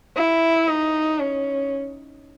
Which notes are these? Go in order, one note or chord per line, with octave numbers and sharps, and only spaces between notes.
E4
D#4
C#4